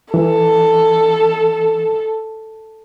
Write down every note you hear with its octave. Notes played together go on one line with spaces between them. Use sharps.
E3 A4